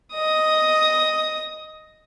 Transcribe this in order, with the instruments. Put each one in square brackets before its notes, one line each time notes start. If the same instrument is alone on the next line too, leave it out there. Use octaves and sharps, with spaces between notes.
[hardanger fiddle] D#5 D#6